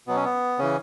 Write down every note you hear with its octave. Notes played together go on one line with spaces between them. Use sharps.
B2 F#3 B3
C#4
B3
C#3 E3 C#4